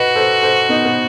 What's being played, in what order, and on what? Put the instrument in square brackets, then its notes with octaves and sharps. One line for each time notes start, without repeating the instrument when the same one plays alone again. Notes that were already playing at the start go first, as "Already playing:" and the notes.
Already playing: [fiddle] F#4 [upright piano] B4 D#5
[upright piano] A4 C5
A4 C5
B3 D#4
B3